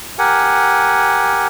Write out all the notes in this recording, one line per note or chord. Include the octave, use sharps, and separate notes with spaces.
G4 A#4 F#5 G#5